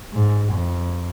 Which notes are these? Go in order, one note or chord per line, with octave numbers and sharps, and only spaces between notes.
G#2
F2